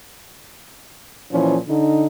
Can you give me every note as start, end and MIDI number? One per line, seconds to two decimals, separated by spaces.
1.32 1.58 46
1.32 1.58 52
1.32 1.58 53
1.32 1.58 61
1.68 2.06 50
1.68 2.06 63